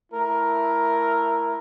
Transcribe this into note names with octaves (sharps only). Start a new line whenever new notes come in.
A3 E4 A#4